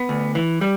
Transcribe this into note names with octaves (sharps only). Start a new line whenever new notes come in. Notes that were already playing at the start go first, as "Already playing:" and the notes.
Already playing: B3
D2
E3
G3